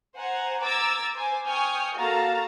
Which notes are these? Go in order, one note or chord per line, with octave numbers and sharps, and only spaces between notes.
C5 F#5 G#5 A#5
A#5 D6 E6 G#6 A6
C5 G#5 D6
G5 G#5 C#6 D#6 F6 G6
A#3 F#4 A4 F5 A5 A#5